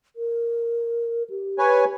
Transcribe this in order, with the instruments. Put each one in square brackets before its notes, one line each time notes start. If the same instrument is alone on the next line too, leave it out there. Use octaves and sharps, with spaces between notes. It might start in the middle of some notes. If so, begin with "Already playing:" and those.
[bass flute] A#4
G4
[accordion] B4 C#5 G#5